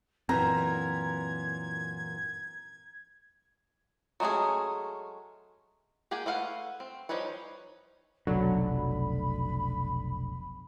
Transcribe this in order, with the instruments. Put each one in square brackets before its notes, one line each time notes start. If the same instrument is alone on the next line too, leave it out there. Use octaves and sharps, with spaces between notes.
[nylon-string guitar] F#2 A#2 E3 [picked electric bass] C4 [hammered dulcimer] A#5 [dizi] G#6
[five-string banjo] F#3 G#3 A3 C#4 G#4
A#3 G4 G#4 F#5 G#5
A3 B4 F5 F#5
C4
F3 G3 D#4 B4 C#5
[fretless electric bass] F1 B1 D3 [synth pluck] F#3 [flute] B5